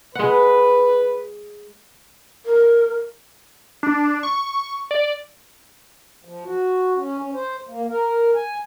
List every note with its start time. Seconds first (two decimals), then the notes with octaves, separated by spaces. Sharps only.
0.15 G#3 B4 F#5
2.46 A#4
3.83 D4
4.23 C#6
4.91 D5
6.25 F3
6.44 F#4
6.97 C#4
7.18 C#4
7.34 C5
7.68 A#3
7.89 A#4
8.35 G#5